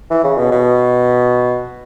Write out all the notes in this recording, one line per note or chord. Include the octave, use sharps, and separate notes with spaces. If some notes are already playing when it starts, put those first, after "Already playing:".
E3
C#3
B2
B2